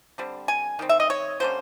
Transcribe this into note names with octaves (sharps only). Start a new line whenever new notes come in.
D3 G3 C4
G#5
D#3 G3 C4
E5
D#5
C#5
D3 G3 A#3 C#4 C5